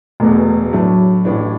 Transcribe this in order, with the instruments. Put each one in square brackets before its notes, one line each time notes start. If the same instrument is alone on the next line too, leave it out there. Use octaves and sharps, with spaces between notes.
[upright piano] E1 E2 B2 [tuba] A3
[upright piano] A2 A3 D4 [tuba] F#3
[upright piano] A1 A2 E3 D4